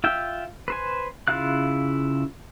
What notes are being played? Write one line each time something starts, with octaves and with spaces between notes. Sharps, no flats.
F4 E5 G5
B4 C5 G#5
C#3 E4 F4 F5 F#6